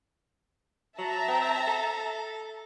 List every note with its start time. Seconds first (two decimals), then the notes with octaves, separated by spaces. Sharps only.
0.98 F#3 E5 A5 A#5
1.28 C4
1.67 A4